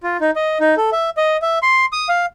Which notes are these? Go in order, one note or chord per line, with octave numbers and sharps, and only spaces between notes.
F4
D#4
D#5
D#4
A4
E5
D#5
E5
C6
D#6
F5